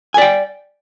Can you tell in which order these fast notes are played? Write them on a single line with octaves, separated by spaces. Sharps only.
G#5 D5 G5